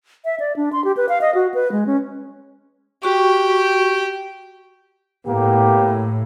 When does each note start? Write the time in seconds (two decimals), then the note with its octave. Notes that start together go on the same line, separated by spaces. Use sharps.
0.25 E5
0.40 D5
0.56 D4
0.73 C6
0.84 G4
0.97 B4
1.09 F5
1.21 D#5
1.35 F#4
1.54 B4
1.72 G#3
1.87 C#4
3.03 F#4 G4 C#6
5.27 A2 A#3 B3 G4